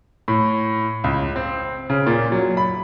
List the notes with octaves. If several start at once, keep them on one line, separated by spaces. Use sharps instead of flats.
A2
C#2
C4
C#3
A#2
F#3
B5